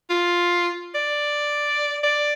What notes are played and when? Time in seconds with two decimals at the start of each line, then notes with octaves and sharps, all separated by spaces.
0.10 F4
0.95 D5
2.03 D5